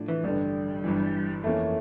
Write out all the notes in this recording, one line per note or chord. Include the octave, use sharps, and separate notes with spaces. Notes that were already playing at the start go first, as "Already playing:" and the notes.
Already playing: A2 F3 D4
E3
A1 G2 D3 G3
G1 G2 E3
F2 E3 A3 A#3 C#4